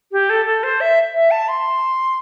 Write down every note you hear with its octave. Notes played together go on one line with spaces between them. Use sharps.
G4
A4
A4
C5
E5
E5
A5
C6